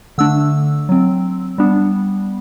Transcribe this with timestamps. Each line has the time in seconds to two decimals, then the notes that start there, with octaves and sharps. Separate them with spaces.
0.18 D3 A3 D4 E6
0.89 F#3 C4
1.58 G3 B3 D4